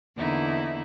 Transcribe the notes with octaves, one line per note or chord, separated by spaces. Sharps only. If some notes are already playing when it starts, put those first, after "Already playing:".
E2 D3 A#3 D#4 E4